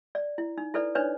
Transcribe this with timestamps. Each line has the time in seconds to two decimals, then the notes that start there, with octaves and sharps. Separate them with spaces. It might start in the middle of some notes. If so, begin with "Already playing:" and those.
0.15 D5
0.38 E4
0.58 D#4
0.74 E4 A4 B4 D5
0.95 D4 D#4 B4 C#5 D5